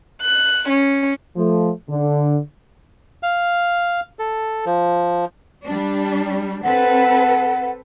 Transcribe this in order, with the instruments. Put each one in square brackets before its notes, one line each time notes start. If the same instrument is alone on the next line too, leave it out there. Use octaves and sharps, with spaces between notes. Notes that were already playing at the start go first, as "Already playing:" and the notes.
[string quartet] F#6
C#4
[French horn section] F3 A3
D3
[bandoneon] F5
A4
F3
[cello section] G3 D4
[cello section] C4 A4 B4 [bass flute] F#5